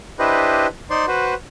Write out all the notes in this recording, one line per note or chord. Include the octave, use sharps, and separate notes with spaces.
D4 E4 G4 B4 C5 D#5
D#4 C5 D5 C6
F#4 B4 C5